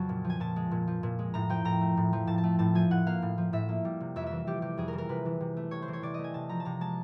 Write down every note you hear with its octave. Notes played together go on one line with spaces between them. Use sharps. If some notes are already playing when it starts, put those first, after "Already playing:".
Already playing: F2 C#3 F#3 A5
A#2
F3
G#5
A#2 A5
G#3
A#2
F3
A#2
G#3
A2 A#5
F3 G5
A2 A#5
A3
A2
F3
A2 A5
A5
A3
A2 A5
F3 G#5
A2 F#5
A#3 F5
A2
F3
A2 E5
A#3
G3
C3
F2 E5
E3 E5
G3 G4
C3 G4
F2 G#4
A#4
E3
A#4
C3 B4
E3
C3
A3
C3 C#5
C5
E3
C#5
C3 D5
A3 D#5
G#5
C3 A5
F3 A#5
A5
C3 A#5
G#3 A5